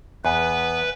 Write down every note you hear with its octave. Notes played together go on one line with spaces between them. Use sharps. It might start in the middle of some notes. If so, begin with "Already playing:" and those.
E2 B3 B4 G#5